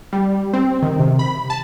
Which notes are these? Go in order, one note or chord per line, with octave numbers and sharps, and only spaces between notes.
G3
C4
D#3
C3
B5
A5